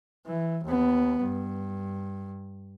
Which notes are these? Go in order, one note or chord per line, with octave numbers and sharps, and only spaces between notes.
E3
D#2 B3
G2